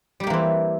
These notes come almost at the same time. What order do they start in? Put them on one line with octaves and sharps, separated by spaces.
G3 G4 A#3 E3 C4